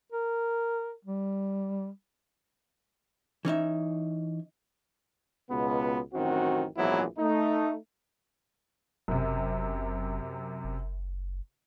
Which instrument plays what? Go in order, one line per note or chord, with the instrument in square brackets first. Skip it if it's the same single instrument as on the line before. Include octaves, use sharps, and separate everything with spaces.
[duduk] A#4
G3
[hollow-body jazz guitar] E3 C#4 D#4 E5
[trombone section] C#2 B2 B3
A1 F#2 D#3 C4 F#4
A#1 G#2 E3 F#3 B3 E4
A3 D#4
[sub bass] F#1 [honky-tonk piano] F#2 C3
[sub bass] F#1